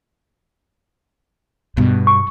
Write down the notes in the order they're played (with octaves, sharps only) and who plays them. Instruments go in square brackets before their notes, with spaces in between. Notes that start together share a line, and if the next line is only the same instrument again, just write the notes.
[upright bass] G2 B2
[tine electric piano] C#6